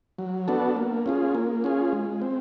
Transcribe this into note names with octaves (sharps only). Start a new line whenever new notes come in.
F#3
B3 D4 F#4 A4
A#3
C#4 F4 G#4
A#3
C#4 F4 G#4
G#3
C4